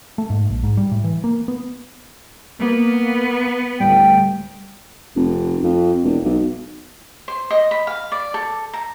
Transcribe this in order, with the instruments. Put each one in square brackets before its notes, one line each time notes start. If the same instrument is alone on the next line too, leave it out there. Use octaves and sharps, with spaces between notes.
[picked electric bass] A3
G#2
A#1
G#2
G3
A2
E3
A#3
B3
[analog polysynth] A#3 [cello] B3
[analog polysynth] D2 A2 [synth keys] G3 [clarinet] G5
[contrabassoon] F1
F2
E1
B1
[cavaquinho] C5
D#5
B5
F5
D5
A4
A#5